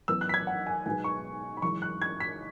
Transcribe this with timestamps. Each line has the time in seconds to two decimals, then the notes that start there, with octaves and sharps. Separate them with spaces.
0.08 F#2 E3 B3 E6
0.21 F#6
0.29 B6
0.34 G#6
0.47 F#5
0.66 G#5
0.86 B1 B2 G#3 B3 G#5
1.04 C#6
1.57 B5
1.62 F#1 F#2 E3 G#3 C#6
1.82 F#6
2.01 G#6
2.20 B6